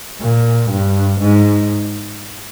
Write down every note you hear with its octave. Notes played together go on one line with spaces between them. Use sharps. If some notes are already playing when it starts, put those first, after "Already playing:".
A#2
G2
G#2